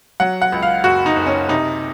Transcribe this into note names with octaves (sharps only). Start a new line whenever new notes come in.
F#3 F#5
F#5
C#2
F5
F#1 F#4
D#4
F#1
C#4
C3 D#4